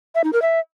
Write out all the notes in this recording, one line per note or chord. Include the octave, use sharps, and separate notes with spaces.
E5
D#4
A#4
E5